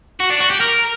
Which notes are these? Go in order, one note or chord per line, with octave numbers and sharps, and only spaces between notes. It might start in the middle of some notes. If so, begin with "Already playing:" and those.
F#4
D4
F#4
G4
A#4